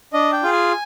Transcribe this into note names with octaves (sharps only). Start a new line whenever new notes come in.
D4 D#5
G5
F4 G#4
G#5